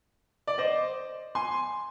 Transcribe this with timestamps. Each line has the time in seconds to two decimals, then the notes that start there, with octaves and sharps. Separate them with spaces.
0.47 D5
0.58 C5 D#5
1.35 G#5 C6